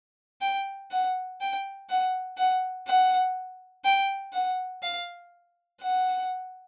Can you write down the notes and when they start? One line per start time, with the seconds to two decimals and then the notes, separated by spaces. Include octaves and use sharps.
0.41 G5
0.91 F#5
1.40 G5
1.89 F#5
2.37 F#5
2.86 F#5
3.84 G5
4.33 F#5
4.82 F5
5.80 F#5